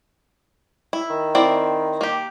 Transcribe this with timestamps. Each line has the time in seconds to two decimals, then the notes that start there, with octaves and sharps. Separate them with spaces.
0.93 E4
1.10 D#3
1.35 C4 E4 D5
2.01 A#3 G4